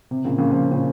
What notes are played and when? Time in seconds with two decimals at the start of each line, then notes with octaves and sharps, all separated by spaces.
0.11 C3
0.25 A#2 C#3
0.38 A#2 C#3
0.51 C#3 F3
0.72 A#2 C#3